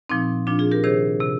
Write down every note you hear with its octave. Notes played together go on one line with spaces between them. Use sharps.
A#2 F3 C4 D#4
A#2 F3 D4 F4
F4 G#4
G4 A#4
C3 D#3 G#4 C5
C3